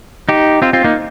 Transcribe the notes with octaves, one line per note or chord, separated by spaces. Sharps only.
D#4 G4
C4 F4
C4 F4
A#3 D#4